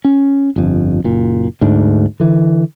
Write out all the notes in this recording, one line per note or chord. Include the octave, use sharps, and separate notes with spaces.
C#4
G1 F2
F#1 A#2
D2 G#2 D4
D3 E3